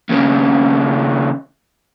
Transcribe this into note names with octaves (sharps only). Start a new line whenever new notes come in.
D#2 C#3